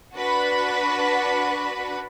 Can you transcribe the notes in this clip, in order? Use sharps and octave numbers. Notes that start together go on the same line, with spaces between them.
D4 F#4 B4